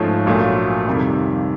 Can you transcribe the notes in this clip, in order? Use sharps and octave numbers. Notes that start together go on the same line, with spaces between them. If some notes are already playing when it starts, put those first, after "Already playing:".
Already playing: G#2 F3 A3 C#4
A#1 A#2 F#3 A3
F2 C3 D#3 G3